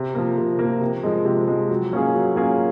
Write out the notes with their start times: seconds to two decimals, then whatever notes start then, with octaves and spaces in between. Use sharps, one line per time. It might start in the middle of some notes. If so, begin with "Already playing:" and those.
Already playing: C3
0.14 F3 A#3
0.37 C3
0.59 F3 A#3
0.81 C3
1.03 F3 G#3
1.25 C3
1.48 F3 G#3
1.70 F#3
1.93 A#3 C#4 F4 G#4
2.14 F#3
2.36 A#3 C#4 F4 G#4